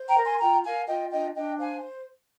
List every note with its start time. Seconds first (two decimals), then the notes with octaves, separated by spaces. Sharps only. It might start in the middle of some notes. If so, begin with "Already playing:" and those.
Already playing: C5
0.09 G5 A#5
0.17 A#4
0.25 G#5 C6
0.40 F4 G5 A#5
0.64 A#4 F5 G#5
0.88 F4 D#5 G5
1.11 D4 D#5 G5
1.35 D4 D#5 G5
1.58 C5 F5 G#5